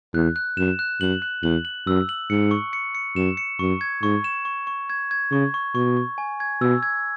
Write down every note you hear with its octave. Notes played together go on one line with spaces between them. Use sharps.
E2 F#6
F#6
F#2 E7
F#6
F#2 F#7
F#6
E2 F#7
F#7
F#2 E6
F#7
G#2 C#7
C#6
C#7
C#7
F#2 E7
C#7
F#2 C#6
G#6
G#2 C#6
E7
C#6
C#6
G#6
G#6
C#3 C#6
C#6
B2 C#6
C#6
G#5
G#6
B2 E6
G#6